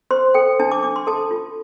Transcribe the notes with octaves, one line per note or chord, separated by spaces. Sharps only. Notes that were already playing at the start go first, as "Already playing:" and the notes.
C5 C6
A4 G5
D4 A5
D6
D4 D6
C6
A4 A5
F4